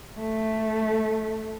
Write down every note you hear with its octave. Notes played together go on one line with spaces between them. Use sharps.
A3